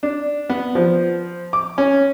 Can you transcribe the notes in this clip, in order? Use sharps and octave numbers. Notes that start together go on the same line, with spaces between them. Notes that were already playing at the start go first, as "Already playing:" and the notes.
D4
B3
F3
D6
C#4